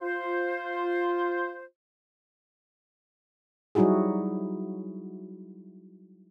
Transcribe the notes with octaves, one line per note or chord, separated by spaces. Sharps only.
F4 C5
F#3 G3 D#4 E4 F#4 G#4